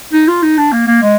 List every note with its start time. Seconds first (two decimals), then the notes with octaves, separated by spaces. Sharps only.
0.13 D#4
0.28 F4
0.42 D#4
0.58 D4
0.72 A#3
0.87 A#3
1.02 G#3